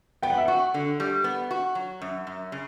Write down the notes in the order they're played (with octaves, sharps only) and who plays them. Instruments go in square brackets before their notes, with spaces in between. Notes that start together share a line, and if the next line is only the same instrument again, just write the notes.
[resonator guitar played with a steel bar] B3 [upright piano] G5
[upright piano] F#5
E5
[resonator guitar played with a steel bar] F#4 [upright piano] F#5
[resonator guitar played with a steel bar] D3
G3
B3
F#4
F#3
F#2
F#2
C#3